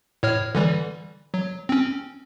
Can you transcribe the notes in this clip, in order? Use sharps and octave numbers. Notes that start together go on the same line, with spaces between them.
A2 C#5 F6
D3 E3 G3
F#3
C4 C#4